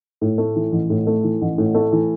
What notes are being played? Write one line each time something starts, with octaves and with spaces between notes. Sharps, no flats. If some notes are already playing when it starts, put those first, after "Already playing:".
A2
A3
E3
A1
A2
A3
E3
A1
A2
A3
E3